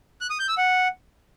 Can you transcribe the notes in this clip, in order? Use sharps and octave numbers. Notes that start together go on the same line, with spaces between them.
F#6
D#6
G6
E6
F#5